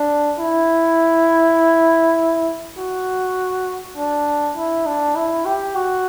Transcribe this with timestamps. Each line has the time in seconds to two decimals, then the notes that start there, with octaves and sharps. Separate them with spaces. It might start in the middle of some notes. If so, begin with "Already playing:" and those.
Already playing: D4
0.39 E4
2.78 F#4
3.97 D4
4.56 E4
4.86 D4
5.16 E4
5.45 G4
5.75 F#4